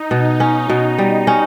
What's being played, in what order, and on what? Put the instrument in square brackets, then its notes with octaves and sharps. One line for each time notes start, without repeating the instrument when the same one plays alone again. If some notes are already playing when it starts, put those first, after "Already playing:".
Already playing: [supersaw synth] D#4
[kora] B2
C#4
B2
G3
C#4